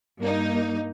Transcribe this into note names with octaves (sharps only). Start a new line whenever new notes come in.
G2 A#3 D#4